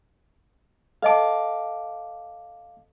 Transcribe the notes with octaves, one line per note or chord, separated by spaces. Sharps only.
A4 D#5 F5 A5 D6